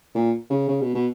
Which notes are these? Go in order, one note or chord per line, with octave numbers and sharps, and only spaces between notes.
A#2
C#3
C#3
B2
B2